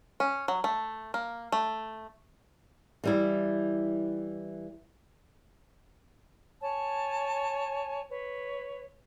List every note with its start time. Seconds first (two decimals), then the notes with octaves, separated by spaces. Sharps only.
0.20 C#4
0.48 F#3
0.64 A3
1.14 A#3
1.52 A3
3.04 E3 G3 E4
6.61 C#5 G#5 A5
8.10 B4 C#5